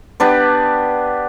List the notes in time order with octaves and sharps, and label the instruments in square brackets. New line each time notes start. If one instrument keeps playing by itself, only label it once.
[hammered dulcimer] B3 D4 G4 B4